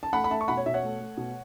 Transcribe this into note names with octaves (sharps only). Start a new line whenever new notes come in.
A5
A3 F#5 B5
B5
A3 E5 A5
C#6
B2 F#5 B5
C#5
B2 E5
C#5 F#5
A3
A3
B2